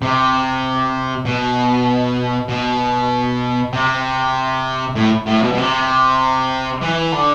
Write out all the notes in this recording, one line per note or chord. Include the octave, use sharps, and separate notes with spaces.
C3
B2
B2
C3
A2
A2
B2
B2
C3
E3
D3